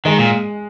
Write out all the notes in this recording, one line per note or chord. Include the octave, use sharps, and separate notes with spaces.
D#3 G#3
A#2